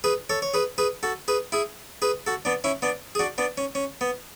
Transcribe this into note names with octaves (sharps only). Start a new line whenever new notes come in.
G#4 B4
A4 C#5
C#5
G#4 B4
G#4 B4
F#4 A4
G#4 B4
E4 G#4
G#4 B4
F#4 A4
B3 D4
C#4 E4
B3 D4
G#4
D4 F#4
B3 D4
C#4
C#4
B3